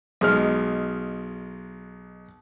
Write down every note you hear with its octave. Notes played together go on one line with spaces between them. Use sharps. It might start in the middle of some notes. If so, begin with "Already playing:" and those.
B1 G#3 F6